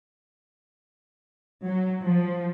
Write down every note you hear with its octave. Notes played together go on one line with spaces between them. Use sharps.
F#3
F3